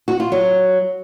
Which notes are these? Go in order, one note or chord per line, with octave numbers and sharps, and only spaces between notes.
F#4
F4
F#3